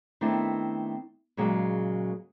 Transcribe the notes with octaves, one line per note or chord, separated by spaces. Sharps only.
D#3 A3 B3 C4 D4 E4
A#2 C#3 F#3 G#3 A#3